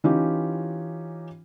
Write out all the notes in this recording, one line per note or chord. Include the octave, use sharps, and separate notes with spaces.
E3 C#4 D#4 F4 G4